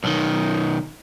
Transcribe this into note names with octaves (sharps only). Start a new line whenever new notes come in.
B1 D#3